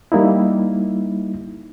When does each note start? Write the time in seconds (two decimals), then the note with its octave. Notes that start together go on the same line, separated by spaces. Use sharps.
0.12 G3 A#3 D#4 E4